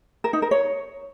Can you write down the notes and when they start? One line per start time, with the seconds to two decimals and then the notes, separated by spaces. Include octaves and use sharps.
0.24 A#4
0.33 D#4
0.42 A#4
0.51 C#5